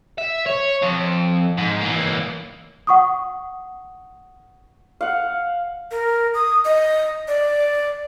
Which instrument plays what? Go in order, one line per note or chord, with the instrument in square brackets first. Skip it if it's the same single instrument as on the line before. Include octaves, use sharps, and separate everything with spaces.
[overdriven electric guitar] E5
C#5
F2
G#2
E3 A#3
[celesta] F#5 C#6 D#6
[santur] F5 F#5
[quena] A#4
D#6
D#5
D5